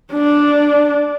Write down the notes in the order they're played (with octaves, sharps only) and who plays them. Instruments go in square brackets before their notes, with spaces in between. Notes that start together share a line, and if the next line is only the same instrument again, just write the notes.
[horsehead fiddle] D4